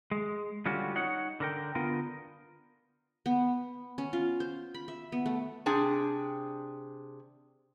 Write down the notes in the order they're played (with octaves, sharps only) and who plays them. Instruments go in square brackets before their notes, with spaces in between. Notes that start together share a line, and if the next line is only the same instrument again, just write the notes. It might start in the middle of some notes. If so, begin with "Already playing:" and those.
[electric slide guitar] G#3
D3 G3 C#4 F4 F#4
D#4 C#5 F#5
D3 A#4 G5
D3 B3 F4 A#4
[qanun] B3
C#4
F4
C5
B5
E5
B3
A3
[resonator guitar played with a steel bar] C3 D4 G#4 G5